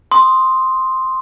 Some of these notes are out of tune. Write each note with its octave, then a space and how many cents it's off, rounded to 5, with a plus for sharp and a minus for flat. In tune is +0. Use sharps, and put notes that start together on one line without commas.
C6 +0 D#6 +0